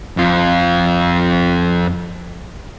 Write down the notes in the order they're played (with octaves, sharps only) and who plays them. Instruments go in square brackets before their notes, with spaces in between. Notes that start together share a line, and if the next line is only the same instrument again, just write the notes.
[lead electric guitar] F2 F4